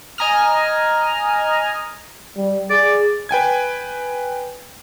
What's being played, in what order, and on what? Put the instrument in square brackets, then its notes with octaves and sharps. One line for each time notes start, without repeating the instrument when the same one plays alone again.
[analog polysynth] D#5 G#5 A#5 D#6 F6
[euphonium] G3
[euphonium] G#4 [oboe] D5
[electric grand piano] B4 G5 G#5 G#6